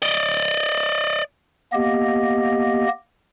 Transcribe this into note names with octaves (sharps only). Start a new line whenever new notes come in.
D5 D#5
A#3 B3 G4 D#5